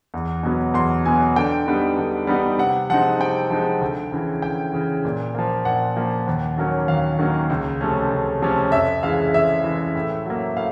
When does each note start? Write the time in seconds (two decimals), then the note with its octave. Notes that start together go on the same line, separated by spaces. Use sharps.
0.14 E2
0.43 B2 F#3 B3
0.74 E2 C6
1.05 B2 F#3 B3 G#5
1.36 D3 G5
1.66 G3 B3 D#4
1.97 D3
2.27 G3 B3 D#4
2.59 C3 F#5
2.90 F3 G#3 C4 D#4 F#5
3.19 C3 G5
3.50 F3 G#3 C4 D#4
3.81 D2
4.12 C#3 E3
4.42 D2 G5
4.73 C#3 E3
5.05 A#2
5.35 F3 A#3
5.65 A#2 F#5
5.96 F3 A#3
6.27 D#2
6.57 D#3 F#3 A#3 C#4
6.88 D#2 F5
7.19 D#3 F#3 A#3 C#4
7.50 C#2
7.81 C3 F3 A3 C#4
8.12 C#2
8.42 C3 F3 A3 C#4
8.72 F2 E5
9.03 C#3 E3 G#3 F5
9.34 F2 E5
9.64 C#3 E3 G#3
9.95 A2
10.26 F#3 A#3
10.56 A2 F5